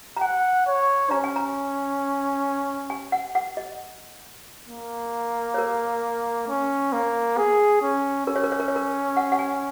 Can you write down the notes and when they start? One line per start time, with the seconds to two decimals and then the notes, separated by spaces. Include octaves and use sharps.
0.17 A#5
0.21 F#5 G#5
0.67 C#5
1.11 C#4 A#5
1.24 G#5
1.36 A#5
2.90 G#5
3.12 F#5
3.35 F#5
3.57 D#5
4.69 A#3
5.54 C#5
5.58 A#4
6.49 C#4
6.93 A#3
7.38 G#4
7.82 C#4
8.27 C#4 A#4
8.36 C#5
8.43 A#4
8.52 C#5
8.60 A#4
8.68 C#5
8.76 A#4
9.17 F#5
9.32 F#5
9.39 G#5